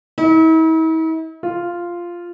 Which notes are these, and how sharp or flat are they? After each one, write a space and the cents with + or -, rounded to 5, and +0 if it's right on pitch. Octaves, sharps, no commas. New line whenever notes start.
E4 -45
F4 -5